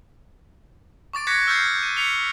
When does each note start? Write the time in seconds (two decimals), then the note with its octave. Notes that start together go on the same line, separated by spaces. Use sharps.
1.13 C#6 D6 A6 D7
1.27 C#6 F#6 G#6 A#6 B6 C#7
1.47 E6 F6 G6 A6 C7
1.83 D#7
1.96 B6 C#7 F7 G7